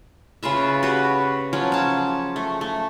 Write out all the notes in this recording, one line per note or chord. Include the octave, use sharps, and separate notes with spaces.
C#3 F4 B4 E5
F#4 G4 B4
F3 F#3 C#4
C#4 A5
A3
A3